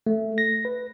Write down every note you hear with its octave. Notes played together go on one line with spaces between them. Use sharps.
A3
A#6
B4